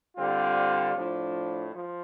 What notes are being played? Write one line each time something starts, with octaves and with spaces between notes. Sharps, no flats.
D3 G3 C4 F4
A2 F3 D4
F3